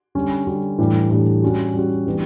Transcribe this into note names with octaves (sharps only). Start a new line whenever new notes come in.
D3 G3 C#4
D3 G3 C#4
A2 E3 G3 D4 G4
A2 E3 G3 D4 G4
G3 C#4 F#4
G3 C#4 F#4
E3 G3 B3 D4